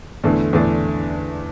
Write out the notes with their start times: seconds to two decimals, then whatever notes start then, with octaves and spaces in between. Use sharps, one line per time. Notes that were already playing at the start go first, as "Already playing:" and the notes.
0.24 E2 D3 A3 D4
0.53 E2 D3 A3 D4